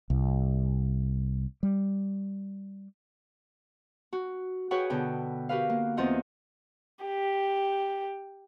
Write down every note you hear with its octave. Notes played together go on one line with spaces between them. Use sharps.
C2
G3
F#4
F#4 G#4 B4 C#5 F#5 G5
B2 D3 G5
F#4 G4 A#4 B4 F5
A#3
E2 C4 F4 D#5 F#5 G6
G4